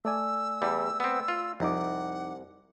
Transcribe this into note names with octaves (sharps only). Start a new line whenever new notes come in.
A3 D5 G#5 E6
E2 G3
B3 C4
F4
C2 F2 D#4 F#5 D6